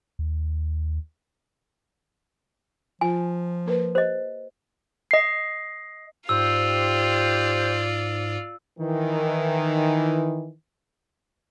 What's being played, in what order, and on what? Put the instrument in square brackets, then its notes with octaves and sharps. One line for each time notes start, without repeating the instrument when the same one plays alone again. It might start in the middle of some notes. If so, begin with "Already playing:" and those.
[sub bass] D#2
[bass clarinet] F3 [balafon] F4 [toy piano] G#5
[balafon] A#3 A#4 B4
[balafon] G4 [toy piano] C5 D#5
[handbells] D#5 C7
[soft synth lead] G#2 [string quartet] F4 D5 [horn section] G4 C5 [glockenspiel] E6
[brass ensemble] D#3 E3